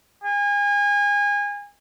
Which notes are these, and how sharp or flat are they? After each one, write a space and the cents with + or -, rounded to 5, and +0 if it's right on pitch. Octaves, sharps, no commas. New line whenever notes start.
G#5 -30